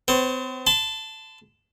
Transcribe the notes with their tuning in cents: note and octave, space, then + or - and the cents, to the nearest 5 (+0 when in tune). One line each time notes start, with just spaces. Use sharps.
C4 -45 C5 +45
A5 +0 C6 -40